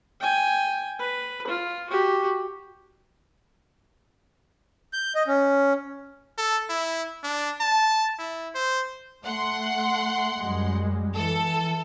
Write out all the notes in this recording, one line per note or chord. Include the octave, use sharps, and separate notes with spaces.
G5 G#5
B4
F4
F#4 G4
G6
D#5
C#4
A4
E4
D4
A5
E4
C5
A3 F#5 C6
F#2 G3 G#3
E3 A4